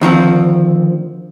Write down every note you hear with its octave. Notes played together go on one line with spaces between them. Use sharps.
D2 D#3 F3 C4